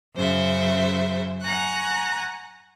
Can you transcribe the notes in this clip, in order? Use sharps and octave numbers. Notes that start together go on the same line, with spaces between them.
F#2 C#3 C5 E5
F#5 G#5 A#5 C#6 F#6